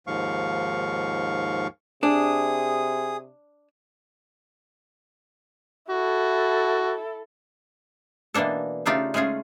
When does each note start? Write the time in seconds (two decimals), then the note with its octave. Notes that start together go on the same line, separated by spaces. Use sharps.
0.07 D#2 G#2 F3 F5 C#6
2.03 C3 D4 G#4 D#6
5.90 E4 F#4 A4
8.34 B2 E3 A#3 D4 A4
8.86 C#3 A3 D4 D#4 F4 G4
9.14 G#3 A3 C#4 F4 G#4